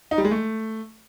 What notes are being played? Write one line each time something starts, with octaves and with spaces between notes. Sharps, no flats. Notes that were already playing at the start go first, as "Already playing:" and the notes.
D#4
G3
G#3
A3